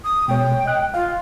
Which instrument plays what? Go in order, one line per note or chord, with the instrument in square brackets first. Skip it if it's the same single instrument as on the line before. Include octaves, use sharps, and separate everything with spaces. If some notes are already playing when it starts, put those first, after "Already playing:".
[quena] D#6
[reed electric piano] B2 G#3 C#5 [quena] G5
[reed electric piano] D#5 F#6
[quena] F4 [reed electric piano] F5